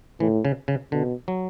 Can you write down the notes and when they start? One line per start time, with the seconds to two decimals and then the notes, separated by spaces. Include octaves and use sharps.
0.20 A2 E3
0.45 C#3
0.68 C#3
0.92 B2 D3
1.28 F#3